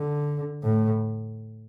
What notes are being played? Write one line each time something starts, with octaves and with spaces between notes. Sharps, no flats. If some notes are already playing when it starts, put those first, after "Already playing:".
Already playing: D3
A2